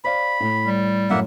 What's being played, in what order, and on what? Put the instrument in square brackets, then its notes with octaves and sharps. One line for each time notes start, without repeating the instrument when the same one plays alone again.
[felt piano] C5 D5 F5 [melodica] B5
[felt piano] A2
[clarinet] G3
[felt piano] F#2 A2 [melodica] A#3 E5 F#5